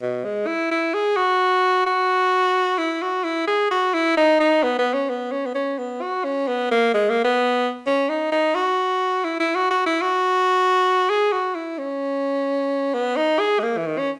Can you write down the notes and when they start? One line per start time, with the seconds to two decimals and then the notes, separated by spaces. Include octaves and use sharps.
0.02 B2
0.24 G#3
0.47 E4
0.71 E4
0.94 G#4
1.16 F#4
1.86 F#4
2.78 E4
3.02 F#4
3.24 E4
3.47 G#4
3.70 F#4
3.94 E4
4.17 D#4
4.40 D#4
4.63 B3
4.78 B3
4.94 C#4
5.09 B3
5.32 C#4
5.46 B3
5.55 C#4
5.78 B3
6.01 F#4
6.24 C#4
6.47 B3
6.71 A#3
6.94 G#3
7.09 A#3
7.24 B3
7.87 C#4
8.09 D#4
8.32 D#4
8.55 F#4
9.24 E4
9.39 E4
9.55 F#4
9.71 F#4
9.86 E4
10.02 F#4
11.09 G#4
11.32 F#4
11.55 E4
11.78 C#4
12.94 B3
13.17 D#4
13.39 G#4
13.59 G#3
13.63 A#3
13.77 E3
13.86 D#3
13.98 C#4